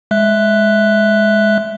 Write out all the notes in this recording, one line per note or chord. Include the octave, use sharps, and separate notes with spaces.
G#3 E5 F#6